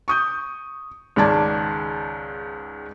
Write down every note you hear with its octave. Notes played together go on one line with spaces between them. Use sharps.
C#6 D#6 G6
C#2 G#2 D#3 D5 A5 G#6